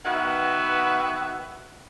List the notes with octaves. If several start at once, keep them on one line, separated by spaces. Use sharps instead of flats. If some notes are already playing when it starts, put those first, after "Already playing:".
D#3 B3 F#4 B4 E5 F#5